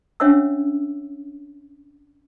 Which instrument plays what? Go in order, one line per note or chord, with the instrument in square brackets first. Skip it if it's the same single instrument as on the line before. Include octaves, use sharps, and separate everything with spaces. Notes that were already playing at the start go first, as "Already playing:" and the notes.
[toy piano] C#4 D4 C#5 E5 F#5 E6